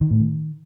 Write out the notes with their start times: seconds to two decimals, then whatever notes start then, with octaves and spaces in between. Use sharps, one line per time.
0.01 D#3
0.11 A2
0.20 D#3